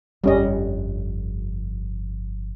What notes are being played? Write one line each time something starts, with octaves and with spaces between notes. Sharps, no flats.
G1 F2 G3 C#4 D#5